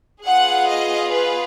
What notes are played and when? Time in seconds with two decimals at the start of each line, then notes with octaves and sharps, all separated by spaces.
0.25 B3 F4 G#4 F#5
0.69 D#5
1.13 B4